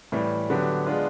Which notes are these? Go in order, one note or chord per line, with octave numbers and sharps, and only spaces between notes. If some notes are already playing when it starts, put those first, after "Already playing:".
A2 E3 G3
D3 F#3 B3 D4 G4
G#3 B3 D4 F4